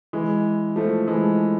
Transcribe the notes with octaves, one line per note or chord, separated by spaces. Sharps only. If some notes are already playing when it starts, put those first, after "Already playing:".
E3 G#3
F3 A3
E3 G#3